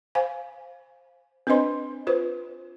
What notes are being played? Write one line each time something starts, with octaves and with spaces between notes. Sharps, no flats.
C5 F5 G#5
C4 D4 B4 C5 D#5 C6
F4 B4 C5